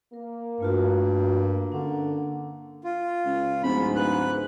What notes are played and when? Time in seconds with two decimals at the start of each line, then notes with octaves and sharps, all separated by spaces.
0.13 A#3 A#4
0.60 G2 A3 F4 F#4
1.72 D3 C#4 D4
2.84 F4
3.26 C#2
3.63 D1 G#2 B5
3.96 B4 F#6